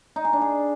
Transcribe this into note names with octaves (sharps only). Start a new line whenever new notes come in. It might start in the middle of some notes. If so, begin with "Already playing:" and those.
D#4
G#4
D4
G#4